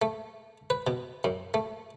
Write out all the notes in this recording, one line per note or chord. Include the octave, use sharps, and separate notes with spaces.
A3
B4
B2
F#2
A3